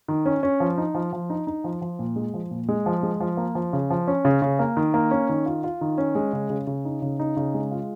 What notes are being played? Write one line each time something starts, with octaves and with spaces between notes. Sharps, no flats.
D#3
C#4
C#4
F3
D#4
F3
F3
D#4
D#4
F3
F3
A#2
G#3
F3
A#2
G#3
F3
G#3
F3
A#3
F3
C#3
F3
C#4
C#3
C#3
A#3
D#3
A#3
C#4
D#3
F4
F4
D#3
C#4
G#3
C#3
C#3
C#3
D#4
C#3
D#4
C#3
G#3
F4